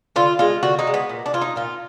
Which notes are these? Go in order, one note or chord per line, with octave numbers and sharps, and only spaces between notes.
D3 F4
G#3 F4
D3 F#4
D#4
G#3
B3
A#2
D4
F#3 F4
D#4
A#2 F4